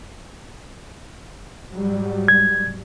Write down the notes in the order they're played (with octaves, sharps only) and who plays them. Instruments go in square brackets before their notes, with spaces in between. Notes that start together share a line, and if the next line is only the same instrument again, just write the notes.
[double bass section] G#2 F#3 G3
[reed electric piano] G#6